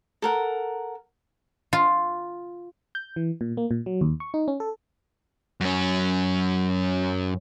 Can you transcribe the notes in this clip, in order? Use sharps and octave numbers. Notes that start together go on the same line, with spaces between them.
A4 A#4 F#5
F4
G6
E3
A#2
A#3
A#2
F#3
D#2
C#6
D#4
C#4
A4
F#2 C#4